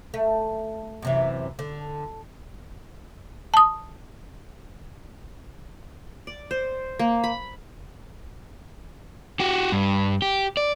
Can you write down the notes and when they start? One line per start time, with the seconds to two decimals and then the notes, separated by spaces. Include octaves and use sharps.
0.14 A3
1.02 F#2 C3 E3
1.59 D3
3.54 A5 D#6
6.27 D5
6.51 C5
6.99 A#3
7.24 B5
9.40 F#4 G4
9.72 G2
10.22 G4
10.57 D5